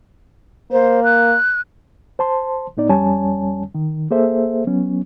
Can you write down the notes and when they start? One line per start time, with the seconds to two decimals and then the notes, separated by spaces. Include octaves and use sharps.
0.72 A#3 C5
1.04 F#6
2.19 C5 A5 C6
2.77 A2 B3 D#4 D5
2.89 F2 G3 C#4 C#5 G#5 A5
3.75 D#3
4.11 A#3 G#4 A4 C5 E5
4.67 F#3 B3 C#4